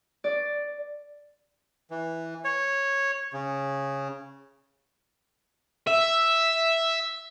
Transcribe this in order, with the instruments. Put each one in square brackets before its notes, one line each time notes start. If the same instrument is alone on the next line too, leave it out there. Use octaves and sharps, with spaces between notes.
[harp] D5
[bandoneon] E3
C#5
C#3
[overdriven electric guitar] E5